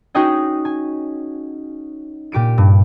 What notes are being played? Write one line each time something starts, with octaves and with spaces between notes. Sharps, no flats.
C#4 D#4 F#4 G#4 D#5 G5
G#5
A#2 G4 D7 D#7
G2